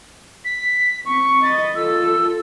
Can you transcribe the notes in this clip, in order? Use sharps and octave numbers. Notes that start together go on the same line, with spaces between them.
B6
C4 C#6
D#5 B5 A6
F4 A4 E6